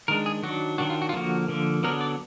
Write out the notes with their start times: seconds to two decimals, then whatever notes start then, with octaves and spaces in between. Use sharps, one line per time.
0.08 D#3 G#3 D4 A#4
0.26 G#4
0.43 D#3 F#3 D4 F#4
0.78 D#3 F#3 D4 F#4
0.90 F4
1.02 F#4
1.09 F4
1.14 D3 F3 A#3 F#4
1.48 D3 F3 A#3
1.83 D3 F#3 B3 D4 A#4
2.01 D5